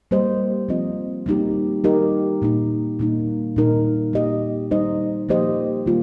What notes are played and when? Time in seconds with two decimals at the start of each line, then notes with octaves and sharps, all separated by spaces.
0.11 G3 A#3 G4 C5 D#5
0.69 F3 C4 F4 D#5
1.26 G3 A#3 D#4 G4
1.84 G3 D#4 G4 A#4 D#5
2.42 A#2 A#3 D#4
2.99 A#2 G3 A#3 D#4
3.56 A#2 G3 D#4 A#4
4.13 A#3 G4 D#5
4.71 G3 D#4 C5 D#5
5.29 F3 A#3 G4 C5 D#5
5.86 D#3 G3 A#3 F4